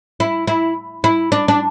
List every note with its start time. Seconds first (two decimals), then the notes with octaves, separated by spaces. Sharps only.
0.20 E4
0.47 E4
1.04 E4
1.32 D4
1.48 D4